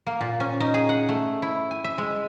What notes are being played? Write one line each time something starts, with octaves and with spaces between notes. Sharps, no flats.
A#3
A#2
C#4
D#4
G#4
F#5
A3
E4
G#5
E5
G#3